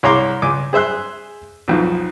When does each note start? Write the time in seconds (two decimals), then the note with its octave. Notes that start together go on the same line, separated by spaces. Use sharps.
0.03 C2 C#5 A#5 C6 D6
0.42 C#2 G#5 D6
0.73 G#4 C5 E5 C6 F#6
1.68 B1 F2 G#2